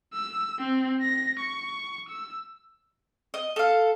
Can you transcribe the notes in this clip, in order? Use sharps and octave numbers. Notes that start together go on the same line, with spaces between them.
E6
C4
A#6
C#6
E6
D#5
A4 F5